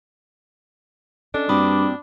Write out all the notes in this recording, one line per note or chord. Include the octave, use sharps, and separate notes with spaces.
C#4 D4 A4 D#5
G2 A#3 C4 F#4 B5 D6 D#6